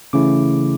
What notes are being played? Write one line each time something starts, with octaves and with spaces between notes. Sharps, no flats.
C#3 E3 A3 C#4 E4 D6